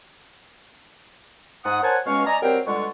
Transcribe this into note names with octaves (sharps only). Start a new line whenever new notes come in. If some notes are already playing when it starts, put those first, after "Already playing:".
G#2 F#5 D#6
A#4 C5 C#5 F#5 G#5 A5
C#2 B2 G#3 C#4 F5 C#6
D5 D#5 G#5 A#5
F#3 G3 C4 A#4 C5 G5
B2 D3 G3 G#3 F4 C#6